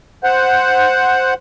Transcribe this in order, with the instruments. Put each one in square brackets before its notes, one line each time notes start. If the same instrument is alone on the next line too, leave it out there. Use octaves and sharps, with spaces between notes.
[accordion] C5 F#5